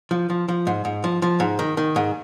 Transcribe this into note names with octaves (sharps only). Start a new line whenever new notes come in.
F3
F3
F3
G#2
G#2
F3
F3
G#2
D#3
D#3
G#2